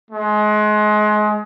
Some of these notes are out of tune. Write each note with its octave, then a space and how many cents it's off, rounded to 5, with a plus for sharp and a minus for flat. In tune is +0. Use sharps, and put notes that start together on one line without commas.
G#3 +30